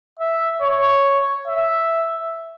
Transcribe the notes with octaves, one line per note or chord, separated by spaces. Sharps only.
E5
C#5
E5